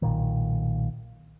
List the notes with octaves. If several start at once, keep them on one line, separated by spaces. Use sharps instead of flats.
B1 A#2 D#3